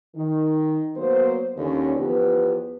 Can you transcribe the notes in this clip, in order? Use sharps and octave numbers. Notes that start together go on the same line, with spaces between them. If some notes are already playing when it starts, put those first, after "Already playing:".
D#3
F#3 A#3 B3 C5
D#2 D3 C#4
E2 F3 B3 G4 B4